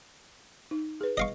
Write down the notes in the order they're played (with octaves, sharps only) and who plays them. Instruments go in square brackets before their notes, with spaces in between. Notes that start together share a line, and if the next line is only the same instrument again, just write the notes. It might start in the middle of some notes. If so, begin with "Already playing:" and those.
[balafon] D#4
G#4 B4
[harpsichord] D#5 F5 C#6